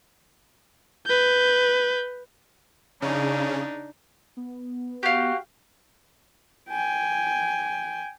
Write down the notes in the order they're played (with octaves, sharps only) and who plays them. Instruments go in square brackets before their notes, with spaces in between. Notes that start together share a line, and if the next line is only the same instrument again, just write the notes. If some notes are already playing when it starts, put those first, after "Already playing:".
[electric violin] B4 G6
[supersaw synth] C#3 [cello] D4 D#4
[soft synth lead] B3
[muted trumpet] F#4 [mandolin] G4 F5
[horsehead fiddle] G5 G#5